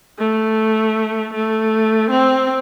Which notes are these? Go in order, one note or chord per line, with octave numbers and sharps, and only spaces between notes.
A3
A3
C4